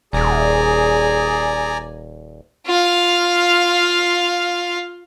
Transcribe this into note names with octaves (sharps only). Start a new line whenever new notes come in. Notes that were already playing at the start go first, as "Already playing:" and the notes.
D#1 G#4 D5 G#5 A#5
F4 F5